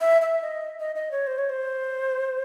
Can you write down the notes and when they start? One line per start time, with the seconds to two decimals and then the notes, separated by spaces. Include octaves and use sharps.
0.01 E5
0.22 E5
0.43 D#5
0.80 D#5
0.95 D#5
1.11 C#5
1.27 C5
1.38 C#5
1.50 C5